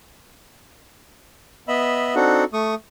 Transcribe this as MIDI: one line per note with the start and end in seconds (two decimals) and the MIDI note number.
1.68 2.15 59
1.68 2.15 75
1.68 2.15 76
1.68 2.15 83
1.68 2.15 88
2.15 2.44 60
2.15 2.44 62
2.15 2.44 63
2.15 2.44 66
2.15 2.44 69
2.15 2.44 78
2.53 2.75 57
2.53 2.75 85
2.53 2.75 87